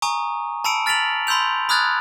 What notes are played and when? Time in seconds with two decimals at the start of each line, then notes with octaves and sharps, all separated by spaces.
0.02 G#5 A#5 C#6 D#6
0.64 A5 B5 E6 C#7 D7
0.86 F6 A6 B6 D7 F7 F#7
1.27 B5 C6 E6 G6 F7
1.69 B5 D#6 F6 F#6 G#6 A6